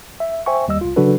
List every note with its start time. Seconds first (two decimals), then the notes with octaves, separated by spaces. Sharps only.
0.20 E5
0.46 C5 E5 G5 G#5 C#6
0.68 D#2 G3 D#5 E6
0.81 C2 F4
0.96 C#3 F#3 D4 F#4 A4 B4